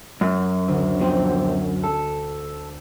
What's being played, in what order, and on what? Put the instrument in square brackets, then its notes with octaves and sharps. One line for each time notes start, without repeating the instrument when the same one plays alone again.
[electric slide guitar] F#2
[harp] D2
[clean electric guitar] F2 B2 C4
A4